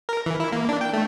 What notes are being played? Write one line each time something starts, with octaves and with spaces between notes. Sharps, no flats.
A#4
E3
E4
A#3
D4
G5
A3